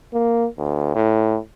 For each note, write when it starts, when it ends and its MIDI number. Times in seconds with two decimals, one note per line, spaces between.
0.14 0.47 58
0.59 0.94 38
0.95 1.39 45